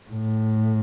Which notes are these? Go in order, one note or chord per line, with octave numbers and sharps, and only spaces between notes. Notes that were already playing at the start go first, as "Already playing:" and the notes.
A2